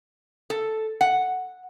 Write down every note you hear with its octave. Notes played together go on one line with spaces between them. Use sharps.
A4
F#5